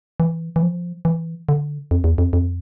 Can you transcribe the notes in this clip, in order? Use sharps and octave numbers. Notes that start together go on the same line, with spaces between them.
E3
E3
F3
E3
D3
F2
E2
F2
F2